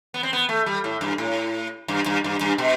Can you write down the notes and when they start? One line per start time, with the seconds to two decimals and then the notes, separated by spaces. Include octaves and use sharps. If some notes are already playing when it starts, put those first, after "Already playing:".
0.14 B3
0.23 C4
0.33 B3
0.49 A3
0.66 G3
0.84 A2
1.01 G2
1.18 A2
1.88 G2
2.06 G2
2.24 G2
2.41 G2
2.58 B2